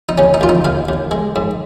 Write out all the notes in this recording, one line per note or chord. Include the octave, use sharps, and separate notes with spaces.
D#4
D#2 C#4
D#4
D#2 F4
D#4
D#2 F5
D#2
G#3
G#2